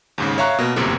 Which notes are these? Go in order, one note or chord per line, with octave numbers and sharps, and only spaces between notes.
D#2 G#2 C#3
C#5 E5 F5 A#5 C#6 F#6
B2 A#3
G1 F#2 A2 C3 A#3